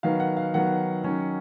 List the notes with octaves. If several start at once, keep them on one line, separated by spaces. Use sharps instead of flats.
D#3 F#3 B3 F5
F#5
F5
D#3 F#3 B3 F#5
D#3 F#3 C#4